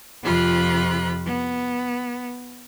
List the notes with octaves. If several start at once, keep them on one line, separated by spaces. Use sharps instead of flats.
F2 C3 F3 F4 B5 F#6
B3